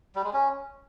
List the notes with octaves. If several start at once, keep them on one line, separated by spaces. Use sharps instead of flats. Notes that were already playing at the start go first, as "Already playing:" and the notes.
G3
G#3
C#4